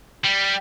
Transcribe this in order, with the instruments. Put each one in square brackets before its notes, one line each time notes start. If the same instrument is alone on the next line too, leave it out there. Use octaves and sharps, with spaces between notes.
[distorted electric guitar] G3